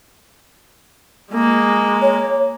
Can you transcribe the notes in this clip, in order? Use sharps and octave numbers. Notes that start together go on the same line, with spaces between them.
G#3 A#3
C#5